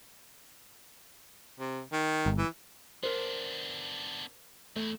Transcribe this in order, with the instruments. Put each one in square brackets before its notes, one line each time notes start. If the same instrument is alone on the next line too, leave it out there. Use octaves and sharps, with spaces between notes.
[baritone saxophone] C3
D#3
[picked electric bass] G1
[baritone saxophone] E3
[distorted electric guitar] B3 D4 [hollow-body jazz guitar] A#4 C5
[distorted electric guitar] E2 E4 [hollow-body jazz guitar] A3